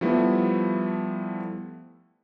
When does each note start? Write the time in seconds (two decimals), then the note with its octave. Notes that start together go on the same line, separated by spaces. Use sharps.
0.01 F3 G3 A3 B3 E4